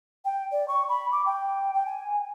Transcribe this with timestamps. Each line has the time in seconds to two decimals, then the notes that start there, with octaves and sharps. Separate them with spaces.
0.25 G5
0.52 D5
0.68 C#6
0.89 B5
1.12 D6
1.26 G5
1.74 G5
1.86 G#5